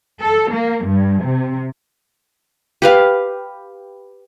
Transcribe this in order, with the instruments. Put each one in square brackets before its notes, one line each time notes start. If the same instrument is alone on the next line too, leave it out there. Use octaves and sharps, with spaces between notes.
[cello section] A4
A#3
G2
C3
[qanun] G4 B4 F5